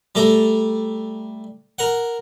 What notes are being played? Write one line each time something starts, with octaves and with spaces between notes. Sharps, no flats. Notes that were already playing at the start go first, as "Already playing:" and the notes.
G3 A3 A#5
A#4 F#5